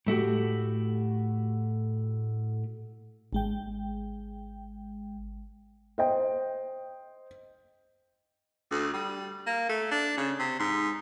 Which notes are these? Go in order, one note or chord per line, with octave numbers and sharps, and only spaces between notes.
A2 A3 F#4 G4
G#1 G#3 G5
C5 D#5 G5
D2
G3
A#3
A3
D4
C#3
C3
G#2